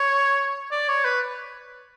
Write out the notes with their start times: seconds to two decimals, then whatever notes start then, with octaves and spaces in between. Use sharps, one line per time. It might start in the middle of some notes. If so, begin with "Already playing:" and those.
Already playing: C#5
0.71 D5
0.88 C#5
1.05 B4